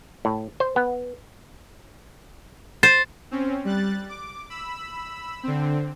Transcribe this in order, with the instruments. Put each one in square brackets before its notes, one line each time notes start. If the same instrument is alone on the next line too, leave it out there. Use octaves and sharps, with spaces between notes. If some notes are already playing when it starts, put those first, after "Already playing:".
[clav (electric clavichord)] A2
C5
B3
[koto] C5 [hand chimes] A6
[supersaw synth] C4 C#4
G3 F#6 A6
D6
B5 E6
D3 C4